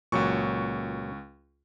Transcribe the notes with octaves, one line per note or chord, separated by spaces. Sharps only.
C#2 A#2 F#3 C#6